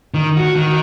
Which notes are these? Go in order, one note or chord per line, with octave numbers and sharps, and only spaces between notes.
D#3
F#4
D#3